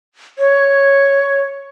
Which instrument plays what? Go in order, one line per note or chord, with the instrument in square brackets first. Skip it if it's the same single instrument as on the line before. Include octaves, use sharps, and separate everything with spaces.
[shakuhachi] C#5